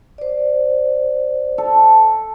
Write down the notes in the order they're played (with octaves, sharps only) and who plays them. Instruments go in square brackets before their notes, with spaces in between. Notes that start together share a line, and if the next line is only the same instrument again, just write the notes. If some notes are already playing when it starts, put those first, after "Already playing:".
[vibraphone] C5 D5
[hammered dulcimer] A4